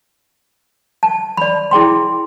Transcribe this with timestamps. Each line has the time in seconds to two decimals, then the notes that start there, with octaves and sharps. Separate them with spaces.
1.03 A5
1.37 D5 B5
1.71 E4 G#4 G5 C6